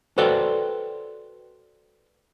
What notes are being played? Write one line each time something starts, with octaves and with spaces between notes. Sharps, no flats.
F#4 A4 B4 C5 D5 G5